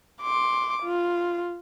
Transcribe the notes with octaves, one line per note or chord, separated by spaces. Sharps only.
C6 D6
F4